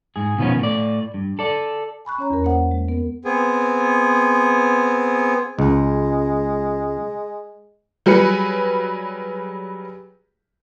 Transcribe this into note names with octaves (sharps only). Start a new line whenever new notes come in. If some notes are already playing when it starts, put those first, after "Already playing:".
G#2 G#4
B2 D#3 F3 B3 C#4
A2 D5
G2
A4 D5
G#5 B5 C#6 F#6
C#4 C#5 A#5
E2 A#4
A#3 C5 E5 F#5
G#3
B3 A#4
B3 C4 G#4
C#2 G#3
F#3 G3 G#4 B4 C#7